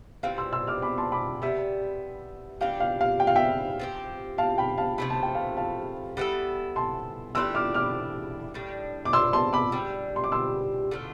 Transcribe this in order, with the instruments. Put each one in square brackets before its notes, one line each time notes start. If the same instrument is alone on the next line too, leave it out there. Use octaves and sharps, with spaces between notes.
[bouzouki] E3 G3 C4 [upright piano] F5
[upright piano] C6 E6
C6 E6
D6 F6
B5 D6
A5 C6
B5 D6
[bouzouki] C3 G3 B3 [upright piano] E5
[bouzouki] E3 G3 D4 G4 [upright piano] F5
[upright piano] F5
F5
G5
F5
E5 G5
[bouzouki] F3 C4 G4
[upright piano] F5 A5
G5 B5
F5 A5
[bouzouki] C3 F3 A3 [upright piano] B5
[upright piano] A5
G5
F5 A5
F5 A5
[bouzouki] G3 B3 E4 A4
[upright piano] A5 C6
[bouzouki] E3 A3 D4 G4 [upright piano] C6 E6
[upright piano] D6 F6
D6 F6
[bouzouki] A2 G3 D4
[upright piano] D6
C6 E6
A5 C6
B5 D6
[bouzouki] G3 D4 G4
[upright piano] C6
D6
C6 E6
[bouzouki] D3 A3 D4 F4